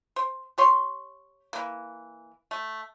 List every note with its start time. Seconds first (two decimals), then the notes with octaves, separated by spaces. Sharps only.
0.16 C5
0.58 G4 C#5 C6
1.53 E3 A#3
2.51 A3